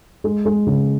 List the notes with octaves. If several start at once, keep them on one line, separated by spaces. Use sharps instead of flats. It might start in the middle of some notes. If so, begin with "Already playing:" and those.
G#3
G#3
C#3